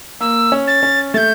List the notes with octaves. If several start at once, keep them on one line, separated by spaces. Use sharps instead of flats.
A#3 E6
C#4
A6
C#4
A3 G6 A6